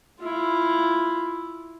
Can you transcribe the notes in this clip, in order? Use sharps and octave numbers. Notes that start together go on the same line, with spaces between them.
E4 F4